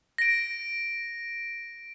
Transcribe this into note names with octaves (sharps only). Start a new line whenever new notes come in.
A#6 D7